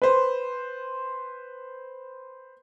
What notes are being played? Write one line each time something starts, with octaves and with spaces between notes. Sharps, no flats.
B4 C5